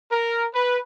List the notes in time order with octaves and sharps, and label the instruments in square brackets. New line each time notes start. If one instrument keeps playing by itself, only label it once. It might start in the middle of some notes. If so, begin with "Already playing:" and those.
[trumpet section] A#4
B4